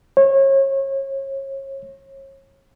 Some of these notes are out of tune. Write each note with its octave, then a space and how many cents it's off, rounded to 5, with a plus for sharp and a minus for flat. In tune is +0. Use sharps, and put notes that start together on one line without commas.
C#5 -35